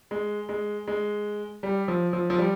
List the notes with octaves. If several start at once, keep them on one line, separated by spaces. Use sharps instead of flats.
G#3
G#3
G#3
G3
F3
F3
F3
G3